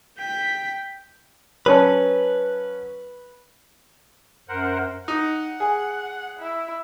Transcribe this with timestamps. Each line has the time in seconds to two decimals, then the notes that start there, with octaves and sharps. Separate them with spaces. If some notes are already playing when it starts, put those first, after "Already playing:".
0.18 G5 B6
1.66 F#3 C#4 B4 A5
4.49 F#2 A#4 C5 F#5
5.08 D#4 F#5
5.60 G#4
6.39 E4